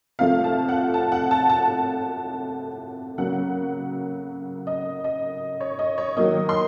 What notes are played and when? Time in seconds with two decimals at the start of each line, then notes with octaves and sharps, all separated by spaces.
0.19 C3 F3 A3 F5
0.44 A5
0.69 F#5
0.94 A5
1.12 F#5
1.31 A5
1.50 A5
3.18 C#3 F#3 A#3 F#5
4.67 D#5
5.04 D#5
5.60 C#5
5.79 D#5
5.98 C#5
6.17 D#3 F#3 A#3 D#5
6.49 C6